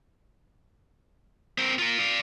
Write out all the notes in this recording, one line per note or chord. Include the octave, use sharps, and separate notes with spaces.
C4 A#4
F4 A#4
D5 F5